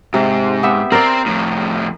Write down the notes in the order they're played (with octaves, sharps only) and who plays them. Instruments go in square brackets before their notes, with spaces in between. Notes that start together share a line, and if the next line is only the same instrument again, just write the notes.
[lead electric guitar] G#2 [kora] C3
[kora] B3 G4 E5
[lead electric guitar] C4 [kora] A#4 D5
[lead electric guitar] F2 A2